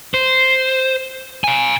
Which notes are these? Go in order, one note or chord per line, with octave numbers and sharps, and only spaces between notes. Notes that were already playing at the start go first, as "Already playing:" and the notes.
C5
F5 G#5